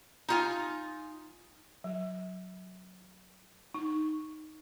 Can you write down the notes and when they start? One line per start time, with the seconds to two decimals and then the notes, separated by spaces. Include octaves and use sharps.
0.28 D#4 F4 G#5
1.84 F#3
3.74 D#4